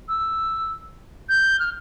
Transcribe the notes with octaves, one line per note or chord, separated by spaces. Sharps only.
E6
G6
F6